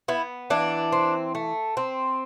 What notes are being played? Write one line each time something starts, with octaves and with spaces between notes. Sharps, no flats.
B3 E4
E3 D4
C4
A3
C4